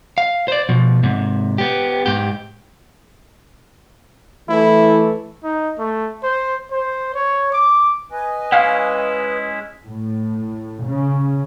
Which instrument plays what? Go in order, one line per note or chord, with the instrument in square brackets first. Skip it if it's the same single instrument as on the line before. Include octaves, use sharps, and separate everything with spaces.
[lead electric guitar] F5
C5 D5
B2 F3
G#2 C3
B3 G4
G#2 G4
[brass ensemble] E3 A3 [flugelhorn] E4
[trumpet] D#4
A3
C5
C5
C#5
D6
[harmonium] B4 D#5 [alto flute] G#5
[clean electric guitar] G#3 C#4 E4 [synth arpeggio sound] F5
[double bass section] A2
C#3